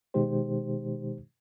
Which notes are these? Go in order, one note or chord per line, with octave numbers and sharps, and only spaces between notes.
B2 D#3 G#3 D#4 G4 C5